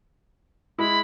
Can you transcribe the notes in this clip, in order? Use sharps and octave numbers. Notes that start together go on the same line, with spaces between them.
G#3 E4 B5